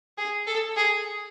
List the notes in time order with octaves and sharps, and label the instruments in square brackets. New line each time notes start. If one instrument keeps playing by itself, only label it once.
[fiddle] G#4
A4
G#4